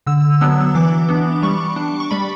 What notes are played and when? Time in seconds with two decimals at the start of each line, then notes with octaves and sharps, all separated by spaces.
0.06 D3 E6
0.41 F#3 B3 D4 E6
0.75 E3 D6
1.09 B3 D4
1.43 G3 C#6
1.76 D4
2.00 C#6
2.11 G3 B5